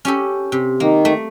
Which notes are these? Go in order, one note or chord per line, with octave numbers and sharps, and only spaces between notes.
C#4 G4 A4
C3
D#3 A#3
A3